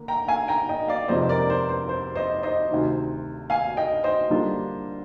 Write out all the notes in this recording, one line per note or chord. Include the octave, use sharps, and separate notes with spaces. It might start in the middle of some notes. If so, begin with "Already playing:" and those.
Already playing: D3 A#3
G5 A#5
F5 G#5
G5 A#5
D#5 G5
D5 F5
F2 C3 F3 G#3 C5 D#5
C5
A#4 D5
C5
C5
C5
C5 D#5
C5 D#5
D2 C3 D#3
F5 G#5
D#5 G5
C5 D#5
D3 G3 A#3 D4 F4